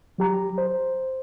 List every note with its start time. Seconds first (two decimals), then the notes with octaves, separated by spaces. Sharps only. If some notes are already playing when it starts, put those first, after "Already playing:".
0.18 F#3 G4 A#5
0.58 C5